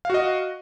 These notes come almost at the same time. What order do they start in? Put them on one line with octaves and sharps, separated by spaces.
F5 F#4 D#5